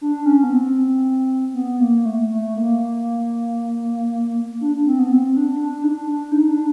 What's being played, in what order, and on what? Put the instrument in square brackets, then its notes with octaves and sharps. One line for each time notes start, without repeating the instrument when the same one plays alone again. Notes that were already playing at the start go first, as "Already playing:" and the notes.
[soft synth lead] D4
C#4
B3
C4
B3
A#3
A3
A3
A#3
D4
C4
B3
C4
D4
D4
D#4
D4
D4
D#4
D4